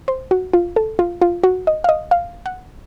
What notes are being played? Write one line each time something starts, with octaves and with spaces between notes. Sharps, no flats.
C5
F#4
F4
A4
F4
F4
F#4
D#5
F5
D#5
F5
F#5